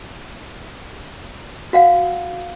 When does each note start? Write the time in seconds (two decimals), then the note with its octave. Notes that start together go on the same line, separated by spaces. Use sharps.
1.73 F#4 F5 F#5